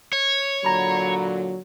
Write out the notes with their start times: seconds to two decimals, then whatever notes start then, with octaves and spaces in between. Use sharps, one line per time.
0.13 C#5
0.65 A#2 D3 F#3 A#5 B5